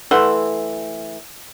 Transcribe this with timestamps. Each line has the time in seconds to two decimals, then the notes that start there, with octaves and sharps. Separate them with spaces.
0.11 E3 A3 F#5 C6